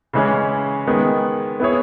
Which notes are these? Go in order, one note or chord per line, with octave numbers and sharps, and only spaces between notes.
C#3 E3 G#3 C#4
D#3 G#3 B3
B3 E4 G#4 C#5